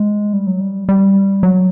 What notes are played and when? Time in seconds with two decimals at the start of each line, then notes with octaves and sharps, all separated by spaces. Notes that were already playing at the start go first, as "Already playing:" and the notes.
Already playing: G#3
0.33 G3
0.47 F#3
0.61 G3
0.89 G3
1.43 F#3